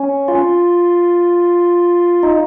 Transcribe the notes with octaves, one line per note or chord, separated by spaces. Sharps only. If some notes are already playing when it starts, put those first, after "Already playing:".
Already playing: C#4
F4
D#4